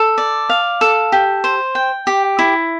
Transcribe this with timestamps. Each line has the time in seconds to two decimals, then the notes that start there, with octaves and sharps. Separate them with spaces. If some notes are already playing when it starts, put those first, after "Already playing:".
Already playing: A4
0.18 D5
0.49 F5
0.81 A4
1.12 G4
1.44 C5
1.75 G5
2.07 G4
2.39 E4